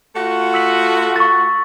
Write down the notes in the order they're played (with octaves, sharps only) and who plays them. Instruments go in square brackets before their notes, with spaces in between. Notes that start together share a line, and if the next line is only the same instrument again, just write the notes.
[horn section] A3 F4 F#4
[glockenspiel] E6 B6 F#7
C#6 A6